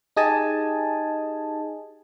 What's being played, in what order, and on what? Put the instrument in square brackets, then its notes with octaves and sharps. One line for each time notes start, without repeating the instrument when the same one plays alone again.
[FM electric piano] D#4 G4 G#4 D#5 G#5 A5